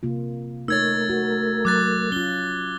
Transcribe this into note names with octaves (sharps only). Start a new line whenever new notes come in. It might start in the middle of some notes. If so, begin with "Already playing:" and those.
C3 A#3 F4
A3 D#4 A#4 C#5 E6 G#6 A6
F#4
F#3 D6 F#6 A6
C#4 F4 G7